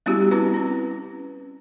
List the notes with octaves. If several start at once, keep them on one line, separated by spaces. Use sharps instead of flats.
G3 B3 C#4 E4 F#4 G4
C4 C#4 E4 B4
C4 C#4